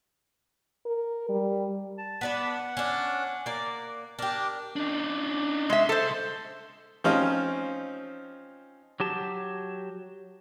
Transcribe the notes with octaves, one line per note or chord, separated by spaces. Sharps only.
A#4
G3
A5
B3 D4 B4 F#5
C#4 D4
A#3 D5
D4 G4 A#4
D4 D#4
C2 G#3 E5 C6
A4 C5
F3 C4 C#4 D#4 F4
F#3 G4 A5